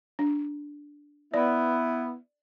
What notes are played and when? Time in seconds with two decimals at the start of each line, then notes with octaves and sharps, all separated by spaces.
0.19 D4
1.34 B3 E4 D5